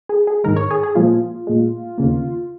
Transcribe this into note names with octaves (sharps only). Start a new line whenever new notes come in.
G#4
G#4
G#2 D#3 G#3 A#4
C#5
G#4
G#4
A#2 F3 G#3 F4
A#2 G#3
D#2 C#3 A#3